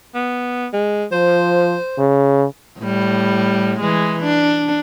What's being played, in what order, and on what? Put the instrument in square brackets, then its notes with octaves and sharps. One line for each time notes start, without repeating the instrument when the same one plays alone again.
[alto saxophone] B3
G#3
[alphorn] F3 [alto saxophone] C5
[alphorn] C#3
[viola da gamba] A2 G3
E3 G#3
D4